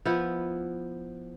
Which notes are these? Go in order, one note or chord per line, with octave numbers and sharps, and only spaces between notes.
F3 B3 E4 B4